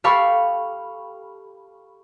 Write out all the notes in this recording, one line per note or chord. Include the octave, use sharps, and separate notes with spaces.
G4 A4 F5 B5 C#6